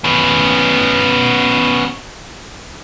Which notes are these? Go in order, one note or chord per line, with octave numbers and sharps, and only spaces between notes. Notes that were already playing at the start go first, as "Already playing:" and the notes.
B3 C#4